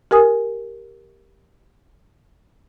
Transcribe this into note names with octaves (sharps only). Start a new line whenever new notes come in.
G4 A#4 G#5 D#6